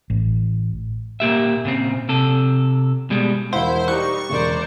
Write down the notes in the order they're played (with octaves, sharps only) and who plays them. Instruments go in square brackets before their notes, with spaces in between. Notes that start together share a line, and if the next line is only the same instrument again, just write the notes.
[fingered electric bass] A1
[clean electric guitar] A#2 A#3 G4 E5
A#2 C#3 C4
C3 A4
B2 G3 G#3
[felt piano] E1 F5 F#5 [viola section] E4 [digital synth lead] C5
[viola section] G3 D#4 [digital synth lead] C#6 [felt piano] F#6
[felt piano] E1 C#3 [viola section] A#4 C5 D5